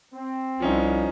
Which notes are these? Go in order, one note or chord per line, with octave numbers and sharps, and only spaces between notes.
C4
C2 F3 C#4 D#4